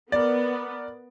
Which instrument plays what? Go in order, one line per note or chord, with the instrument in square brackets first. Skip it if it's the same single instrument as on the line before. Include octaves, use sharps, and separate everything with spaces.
[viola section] B3 [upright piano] A#4 D5